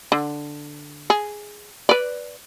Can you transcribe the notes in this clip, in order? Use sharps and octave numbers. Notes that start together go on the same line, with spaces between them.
D3
G#4
B4 D5